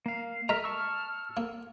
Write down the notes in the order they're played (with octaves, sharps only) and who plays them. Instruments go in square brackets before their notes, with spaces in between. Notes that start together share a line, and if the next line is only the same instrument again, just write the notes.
[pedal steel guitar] A#3 F5
[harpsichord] G#3 [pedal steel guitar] A#4 E5 A#5 [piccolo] F6
[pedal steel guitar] A5 C#6 E6
[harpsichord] A#3